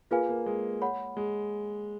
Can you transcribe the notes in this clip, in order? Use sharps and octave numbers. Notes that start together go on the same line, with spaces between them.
A#3 F4 G#4 B4 F5 G#5
A#3
G#3
C#5 F#5 B5
G#3